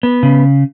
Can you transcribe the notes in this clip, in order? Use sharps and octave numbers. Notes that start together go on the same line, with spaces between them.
B3
C#3